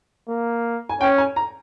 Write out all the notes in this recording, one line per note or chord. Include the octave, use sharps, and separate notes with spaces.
A#3
G#5
C#4 G5
G#5
A#5